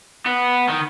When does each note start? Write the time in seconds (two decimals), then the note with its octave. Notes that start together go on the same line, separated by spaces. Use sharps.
0.26 B3
0.69 D#3